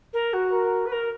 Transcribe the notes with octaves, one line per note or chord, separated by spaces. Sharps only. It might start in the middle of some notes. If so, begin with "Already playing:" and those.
A#4
F#4
A#4
B4
A#4